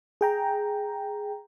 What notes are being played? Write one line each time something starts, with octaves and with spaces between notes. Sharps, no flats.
G#4 G5 A#5